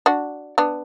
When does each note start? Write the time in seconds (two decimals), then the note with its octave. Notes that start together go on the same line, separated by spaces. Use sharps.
0.06 D4 F#4
0.58 B3 D4